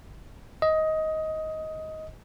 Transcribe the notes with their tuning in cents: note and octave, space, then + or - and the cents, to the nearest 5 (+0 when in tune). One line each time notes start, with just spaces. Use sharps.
D#5 +15